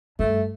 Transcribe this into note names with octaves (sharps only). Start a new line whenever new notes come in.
G2 A3